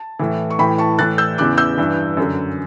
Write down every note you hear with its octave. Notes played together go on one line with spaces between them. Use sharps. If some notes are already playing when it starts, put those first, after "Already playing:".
Already playing: A5
A2 E3
C#6
A2 E3 G5 B5
A5 C#6
A2 E3 F#6 A6
E6 G6
E2 C#3 E3 D6 F#6
E6 G6
G2 E3
F#2 D3